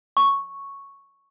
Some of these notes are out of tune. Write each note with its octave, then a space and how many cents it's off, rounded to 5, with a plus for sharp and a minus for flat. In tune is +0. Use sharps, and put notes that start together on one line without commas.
C#6 +0